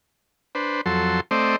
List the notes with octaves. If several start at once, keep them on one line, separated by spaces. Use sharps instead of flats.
D4 B4 C5
F2 F#3 A4 C6
A3 C4 C5 D5 D#5